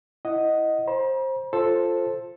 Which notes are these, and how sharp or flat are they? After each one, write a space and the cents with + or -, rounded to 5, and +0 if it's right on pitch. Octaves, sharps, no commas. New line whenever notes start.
E4 +0 D#5 +0 F#5 +0
C5 +20 A#5 +45
F4 +0 A4 +0 C5 +10